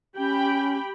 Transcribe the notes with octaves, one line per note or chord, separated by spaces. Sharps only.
C#4 G4 G5 B5